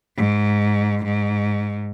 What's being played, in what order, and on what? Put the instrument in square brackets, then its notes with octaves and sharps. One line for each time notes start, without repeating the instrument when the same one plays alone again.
[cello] G#2
G#2